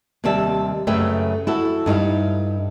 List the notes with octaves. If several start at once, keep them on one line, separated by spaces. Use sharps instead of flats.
D#2 C3 D#3 G3 E5 A5
F#2 C#3 A3 B4 E5 G5
E4 F#4 A4
G2 D#4 E4 F5